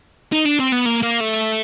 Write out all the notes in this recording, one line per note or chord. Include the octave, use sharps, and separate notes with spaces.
D#4
D4
C4
B3
A#3
A#3
A3